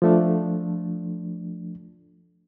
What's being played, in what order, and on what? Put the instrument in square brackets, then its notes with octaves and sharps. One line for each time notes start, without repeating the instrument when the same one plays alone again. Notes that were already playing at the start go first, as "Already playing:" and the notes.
[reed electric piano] F3 A3 D4